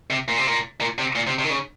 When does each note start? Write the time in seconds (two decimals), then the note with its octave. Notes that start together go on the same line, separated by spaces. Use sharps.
0.10 C3
0.28 A#2
0.37 C3
0.47 A#2
0.81 A#2
0.98 C3
1.15 A#2
1.27 C3
1.39 C3
1.44 D#3
1.50 C#3